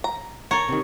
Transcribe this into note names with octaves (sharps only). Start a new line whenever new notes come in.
A#5
A4 A#4 C#5 A#5
C3 D#3